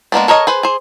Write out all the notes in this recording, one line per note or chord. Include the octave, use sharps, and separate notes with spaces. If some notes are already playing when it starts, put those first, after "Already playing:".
G#3 A#3 B3 D4
A4 A#4 C#5 D#5
G#4 B4 C5
G#4 C5